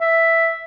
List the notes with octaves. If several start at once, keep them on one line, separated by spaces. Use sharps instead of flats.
E5